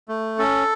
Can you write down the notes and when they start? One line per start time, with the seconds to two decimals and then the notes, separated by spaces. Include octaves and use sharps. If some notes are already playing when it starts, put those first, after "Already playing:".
0.09 A3
0.39 C#4 A4